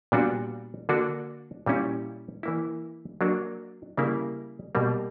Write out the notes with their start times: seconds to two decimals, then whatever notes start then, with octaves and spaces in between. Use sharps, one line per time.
0.12 A#2 G3 B3 D4 F#4
0.89 D3 A#3 D4 F#4
1.66 A#2 G3 C#4 E4
2.43 E3 A#3 E4
3.21 F#3 A#3 D4 F#4
3.97 C#3 G3 A#3 E4
4.75 B2 G3 A#3